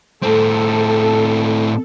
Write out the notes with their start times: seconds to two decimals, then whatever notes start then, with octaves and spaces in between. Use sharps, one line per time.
0.23 A2 C4 A4